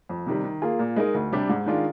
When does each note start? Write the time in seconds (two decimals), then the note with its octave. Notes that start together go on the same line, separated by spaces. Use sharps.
0.09 F2
0.26 C3 D#3 G3
0.44 D#3
0.62 A#3 F4 G#4
0.79 A#2
0.96 G#3 D#4 A#4 D#5
1.14 D2
1.32 C3 G3 D4 G4
1.49 G#2
1.66 D#3 G#3 D4 F4